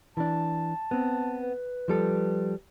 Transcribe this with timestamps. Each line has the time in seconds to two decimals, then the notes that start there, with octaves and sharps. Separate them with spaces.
0.17 E3 D4 A5
0.91 B3 C4
1.42 B4
1.88 F3 G3 A4